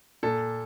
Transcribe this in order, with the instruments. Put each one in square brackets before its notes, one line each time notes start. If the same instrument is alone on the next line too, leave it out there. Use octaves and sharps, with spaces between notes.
[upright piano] A#2 A4